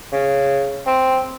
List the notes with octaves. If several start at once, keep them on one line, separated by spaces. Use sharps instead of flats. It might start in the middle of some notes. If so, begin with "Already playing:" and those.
C#3
C4